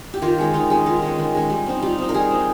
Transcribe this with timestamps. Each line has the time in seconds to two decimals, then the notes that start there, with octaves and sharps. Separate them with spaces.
0.14 G4
0.22 D#3 F4
0.38 G#3 C#4
0.54 D#3 D#4
0.70 G#3 C#4
0.86 D#3 F4
1.02 G#3 C#4
1.18 D#3
1.35 G#3 C#4
1.50 G3
1.66 C4 D#4
1.82 G3 F4
1.99 C4 D#4
2.09 A#4
2.14 G3 G#4
2.31 C4 D#4